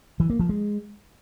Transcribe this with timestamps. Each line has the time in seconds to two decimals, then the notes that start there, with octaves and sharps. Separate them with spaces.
0.20 E3
0.30 A#3
0.39 F3
0.49 G#3